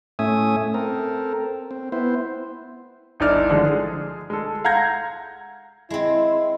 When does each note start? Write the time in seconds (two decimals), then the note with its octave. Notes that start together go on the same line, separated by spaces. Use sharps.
0.19 A2 A3 C#4 E5 G#5 D#6
0.74 C4 A4 A#4
1.71 C4
1.92 B3 E4 C5
3.20 G1 D#4 E4 D5 F6
3.50 D3 F3 G#3 D4
3.66 G#4
4.30 G#3 A4
4.65 F5 F#5 A#5 G6 G#6 A#6
5.90 G#3 C4 E4